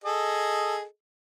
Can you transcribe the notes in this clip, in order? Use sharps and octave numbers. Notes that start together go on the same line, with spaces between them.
G#4 A4 D#5